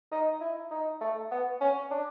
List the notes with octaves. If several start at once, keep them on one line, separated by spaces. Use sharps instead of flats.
D#4
E4
D#4
A3
B3
C#4
D4